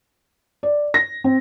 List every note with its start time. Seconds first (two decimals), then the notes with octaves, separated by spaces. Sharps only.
0.63 D5
0.94 A#6
1.24 C4